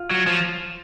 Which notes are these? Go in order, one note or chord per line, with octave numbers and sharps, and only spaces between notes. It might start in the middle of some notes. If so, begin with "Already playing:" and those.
Already playing: F4
F#3
F3